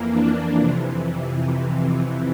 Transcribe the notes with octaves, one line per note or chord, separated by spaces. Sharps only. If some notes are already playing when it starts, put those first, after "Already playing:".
Already playing: F2 E3 A#3
D4
F2 C3 E3